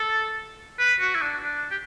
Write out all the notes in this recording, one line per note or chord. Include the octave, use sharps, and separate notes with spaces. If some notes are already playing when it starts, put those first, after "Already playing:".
Already playing: A4
B4
F#4
E4
D4
D4
G4